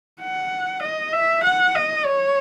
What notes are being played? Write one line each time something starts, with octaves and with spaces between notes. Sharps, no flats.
F#5
D#5
E5
F#5
D#5
C#5